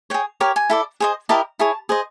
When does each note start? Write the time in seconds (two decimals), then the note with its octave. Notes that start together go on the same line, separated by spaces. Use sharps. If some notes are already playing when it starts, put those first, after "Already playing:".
0.10 G#4 C#5 G5
0.40 G4 A#4 C#5 G#5
0.56 G#5
0.70 E4 A4 D5
1.00 G#4 C5 D#5
1.29 E4 G4 A#4 D#5 A5
1.59 E4 G#4 C#5 A5
1.89 G#4 C5 D#5